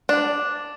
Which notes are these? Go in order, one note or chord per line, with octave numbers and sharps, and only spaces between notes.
D4